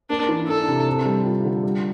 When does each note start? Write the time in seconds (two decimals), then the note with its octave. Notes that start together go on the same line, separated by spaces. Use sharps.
0.10 A#3 D4
0.29 E3
0.48 D4 A4
0.68 C3
0.87 C4
1.05 G3
1.25 F4
1.45 D3
1.64 G3